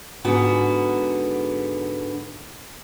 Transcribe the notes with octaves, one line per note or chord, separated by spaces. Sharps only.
G#2 D3 B3 F#4